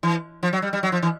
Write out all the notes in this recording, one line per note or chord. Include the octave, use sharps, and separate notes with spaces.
E3
F3
F#3
G3
G3
F#3
F3
E3